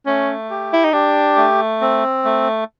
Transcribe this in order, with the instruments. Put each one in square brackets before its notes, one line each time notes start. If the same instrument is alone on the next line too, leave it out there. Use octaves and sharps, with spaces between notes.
[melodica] A3 [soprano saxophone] C#4
[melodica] G4
[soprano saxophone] E4
D#4
[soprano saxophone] D4 [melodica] G4
[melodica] A3
C4
A3